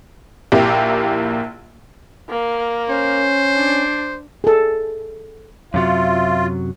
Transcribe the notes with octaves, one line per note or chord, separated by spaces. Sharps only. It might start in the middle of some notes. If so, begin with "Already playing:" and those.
A#1 A#3 E4 G4
A#3
C#4 C5
D4
G#4 A4
F#2 C3 F#3 F4 E5